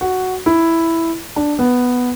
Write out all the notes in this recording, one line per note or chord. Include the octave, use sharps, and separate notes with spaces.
F#4
E4
D4
B3